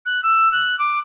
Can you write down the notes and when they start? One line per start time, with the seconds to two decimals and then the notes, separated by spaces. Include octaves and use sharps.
0.05 F#6
0.23 E6
0.52 F#6
0.79 D6